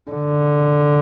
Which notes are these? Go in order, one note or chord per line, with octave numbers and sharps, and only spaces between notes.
D3